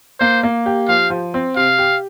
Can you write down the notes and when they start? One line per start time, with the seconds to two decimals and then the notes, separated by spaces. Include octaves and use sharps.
0.20 A#3 C5
0.43 A#3
0.66 G4
0.88 F3 F5
1.10 F3
1.34 C4
1.56 C3 F5
1.78 G4